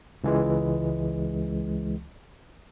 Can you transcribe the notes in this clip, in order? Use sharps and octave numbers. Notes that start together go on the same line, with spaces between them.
C#2 E3 G#3